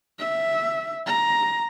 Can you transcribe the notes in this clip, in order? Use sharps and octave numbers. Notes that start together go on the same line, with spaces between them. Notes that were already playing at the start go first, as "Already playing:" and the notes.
E5
A#5